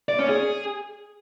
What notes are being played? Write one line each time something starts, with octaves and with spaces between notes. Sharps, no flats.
D5
C#4
G#4